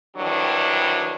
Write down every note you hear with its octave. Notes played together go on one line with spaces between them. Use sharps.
D2 D#3 E3 F#3 G3 D4